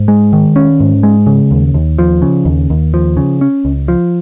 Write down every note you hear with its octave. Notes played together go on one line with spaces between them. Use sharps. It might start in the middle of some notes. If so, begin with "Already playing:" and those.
Already playing: G#2
G#3
D#3
C#4
G#2
G#3
C#3
D#2
D#2
F3
C#3
D#2
D#2
F3
C#3
C#4
C#2
F3